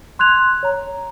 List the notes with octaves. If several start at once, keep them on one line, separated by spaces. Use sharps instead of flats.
C6 F#6 G#6 F7
C#5 A#5